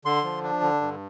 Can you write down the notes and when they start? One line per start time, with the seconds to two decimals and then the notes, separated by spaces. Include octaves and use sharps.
0.05 D3 C6
0.24 F3
0.43 D4
0.61 D3
0.81 G2